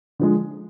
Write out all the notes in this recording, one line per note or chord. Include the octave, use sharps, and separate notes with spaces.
D3 F3 G#3